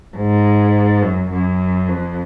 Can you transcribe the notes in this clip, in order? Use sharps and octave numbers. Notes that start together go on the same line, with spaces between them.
G#2
F#2
F#2
F2